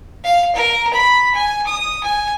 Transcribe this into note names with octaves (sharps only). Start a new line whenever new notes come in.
F5
A#4
B5
G#5
D#6
G#5